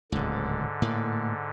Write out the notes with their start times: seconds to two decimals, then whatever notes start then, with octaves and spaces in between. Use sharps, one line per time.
0.12 D1 C#2 G#2 D3
0.82 A2 A#3